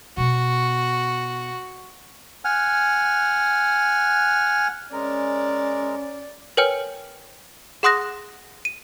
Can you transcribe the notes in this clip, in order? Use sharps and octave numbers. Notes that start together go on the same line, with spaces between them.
B2 B3 F#4
F#5 G#5 F6
G#3 C#4 A#4 D5
A#4 B4 C#5 G5 G#5 F6
G#4 F#5 C6 D#6 F#6 A#6
D#7